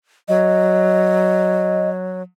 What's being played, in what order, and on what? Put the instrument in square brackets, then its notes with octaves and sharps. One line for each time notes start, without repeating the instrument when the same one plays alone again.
[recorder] F#3 [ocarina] D#5